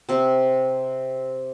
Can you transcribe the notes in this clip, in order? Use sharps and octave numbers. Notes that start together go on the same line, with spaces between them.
C3 C4